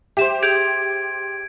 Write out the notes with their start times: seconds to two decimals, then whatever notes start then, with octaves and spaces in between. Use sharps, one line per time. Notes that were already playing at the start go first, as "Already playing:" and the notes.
0.17 G4 C5 E5 E7
0.43 G#4 G6 G#6 D7 F7